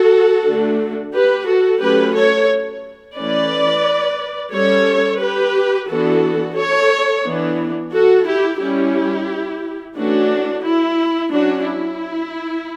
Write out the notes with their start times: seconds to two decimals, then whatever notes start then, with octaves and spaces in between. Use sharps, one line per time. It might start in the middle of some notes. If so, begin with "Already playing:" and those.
Already playing: F#4 A4
0.46 D3 A3 D4
1.14 G4 B4
1.47 F#4 A4
1.81 F#3 A3 C#4 G4 B4
2.15 A4 C#5
3.17 E3 A3 C#4 B4 D5
4.52 G3 C#4 A4 C#5
5.21 G4 B4
5.89 E3 B3 D4 F#4 A4
6.56 A4 C#5
7.24 E3 B3 D4
7.92 F#4 A4
8.26 E4 G4
8.60 G3 C#4 E4 G4
9.96 E3 A3 C#4 D4 F#4
10.64 E4
11.31 F#3 C#4 D4 F#4
11.65 E4